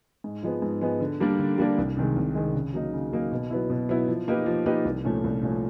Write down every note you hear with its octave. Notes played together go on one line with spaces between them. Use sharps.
G#2
F3 G#3 B3
G#2
F3 G#3 B3
D3
G3 A#3 D4
D3
G3 A#3 D4
C2
C3 D#3 G#3
C2
C3 D#3 G#3
C#3
F#3 A#3 D#4
C#3
F#3 A#3 D#4
B2
F#3 B3 E4
B2
F#3 B3 E4
F3
A#3 D#4 G4 B4
F3
A#3 D#4 G4 B4
C2
A#2 F3 A3 C#4
C2
A#2 F3 A3 C#4